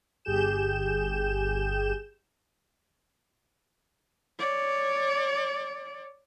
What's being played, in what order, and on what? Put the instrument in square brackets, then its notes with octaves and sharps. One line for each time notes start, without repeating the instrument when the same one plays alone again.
[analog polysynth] G1 G4 G#4 G6 E7
[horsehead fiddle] C#5 D5